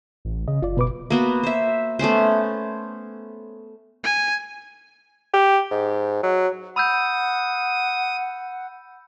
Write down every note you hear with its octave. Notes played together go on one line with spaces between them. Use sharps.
A1
C#3 D#5
F#1 F4 D5
B2 B4 D6
A#3 B3 F#4
C5 E5
A3 B3 C#4 C5
G#5
G4
G#2
F#3
F#5 B5 D#6 E6 G6